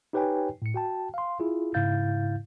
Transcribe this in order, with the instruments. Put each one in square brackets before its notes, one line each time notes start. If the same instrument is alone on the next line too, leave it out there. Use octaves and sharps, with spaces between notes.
[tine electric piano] D#4 G4 B4 C#5 G5 G#5
A2 C#7
F#4 G5 A5
F5 C6
E4 F4 G#4
G#2 C#3 E4 F5 G6 A6